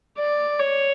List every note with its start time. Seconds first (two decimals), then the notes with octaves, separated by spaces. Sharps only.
0.18 D5
0.59 C#5